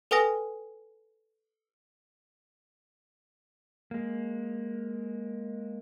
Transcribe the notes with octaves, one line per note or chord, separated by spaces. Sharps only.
A4 B4 G5 G#5 D#6 A#6
G#3 A#3